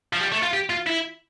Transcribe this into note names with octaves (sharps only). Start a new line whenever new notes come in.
F3
G3
A3
F4
G4
F4
E4